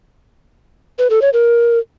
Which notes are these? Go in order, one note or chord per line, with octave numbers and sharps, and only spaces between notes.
B4
A4
C#5
A#4